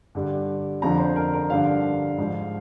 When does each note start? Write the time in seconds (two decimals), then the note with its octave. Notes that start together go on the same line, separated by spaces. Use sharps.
0.15 G2 D3 G3
0.82 F2 D3 F3 A#5
0.99 C5
1.16 A#4
1.34 A#4
1.50 G2 D3 F3 F5
2.18 G#2 F3